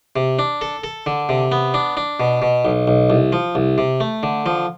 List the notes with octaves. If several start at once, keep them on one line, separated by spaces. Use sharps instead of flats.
C3
D4
A4
A4
D3
C3
B3
D4
D4
B2
B2
B1
B1
C2
F3
C2
C3
A3
D3
F3